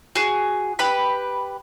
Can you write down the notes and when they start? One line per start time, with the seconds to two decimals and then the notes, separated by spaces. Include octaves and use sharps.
0.15 F#4 G#4
0.79 G4 B4 B5